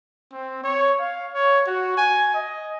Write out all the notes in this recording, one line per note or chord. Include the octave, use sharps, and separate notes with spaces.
C4
C#5
F5
C#5
F#4
G#5
D#5